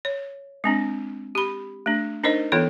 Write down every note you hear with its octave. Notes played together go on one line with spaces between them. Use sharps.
C#5
G#3 C4 D4
G4 B5
A3 D4
D4 D#4 A#4 C5 D#5
E3 B3 F4 A4 C#5